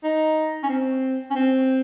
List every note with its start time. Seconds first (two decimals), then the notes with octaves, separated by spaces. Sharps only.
0.03 D#4
0.63 C#4
0.69 C4
1.30 C#4
1.35 C4